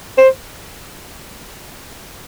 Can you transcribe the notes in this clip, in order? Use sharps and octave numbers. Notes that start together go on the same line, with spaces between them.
C5